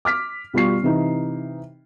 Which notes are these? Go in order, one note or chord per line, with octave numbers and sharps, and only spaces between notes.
D6 F6 B6
B2 G3 F4 C#6 C7
C3 E3 D#4